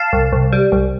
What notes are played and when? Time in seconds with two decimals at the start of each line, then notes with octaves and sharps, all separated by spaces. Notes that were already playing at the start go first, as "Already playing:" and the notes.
Already playing: F5 A5
0.13 C2
0.32 C2
0.52 G3
0.72 C2